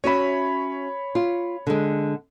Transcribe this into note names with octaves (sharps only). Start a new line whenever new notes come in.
C#4 F#4 C#5 E5 B5
F4
D3 G#3